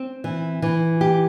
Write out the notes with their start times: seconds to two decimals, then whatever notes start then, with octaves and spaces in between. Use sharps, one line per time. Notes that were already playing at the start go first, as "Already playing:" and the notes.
Already playing: C4
0.24 E3
0.62 E3
1.01 G4